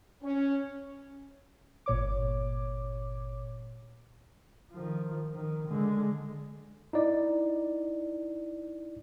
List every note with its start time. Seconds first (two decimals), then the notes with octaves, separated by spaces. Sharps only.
0.23 C#4
1.86 G1 A#2 C#5 D6
4.72 D#3 F3
5.34 D#3
5.68 D3 G#3
6.93 D#4 E4 D5 D#5